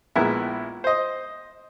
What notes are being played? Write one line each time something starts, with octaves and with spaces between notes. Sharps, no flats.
A#1 G#3 A#3 B3 E4 E5
C5 D#5